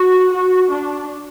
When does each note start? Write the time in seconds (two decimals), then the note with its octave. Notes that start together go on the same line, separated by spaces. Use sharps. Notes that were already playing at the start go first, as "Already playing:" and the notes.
Already playing: F#4
0.32 F#4
0.71 D4